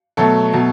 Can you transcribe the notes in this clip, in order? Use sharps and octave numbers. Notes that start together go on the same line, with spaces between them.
B2 F#3 A3 A4
B2 F#3 A3